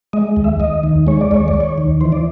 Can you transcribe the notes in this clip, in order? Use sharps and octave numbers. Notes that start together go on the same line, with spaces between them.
G#3 D#5
D#2
E5
D#2 D#5
D#3
G#3 C#5
D5
D#2 C#5
D5
D#2
C#5
D#3
E3 C5
D5